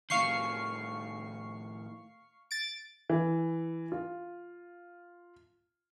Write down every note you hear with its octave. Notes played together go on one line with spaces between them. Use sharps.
A2 D#3 F5 C#6 C7
A6 D7
E3
F4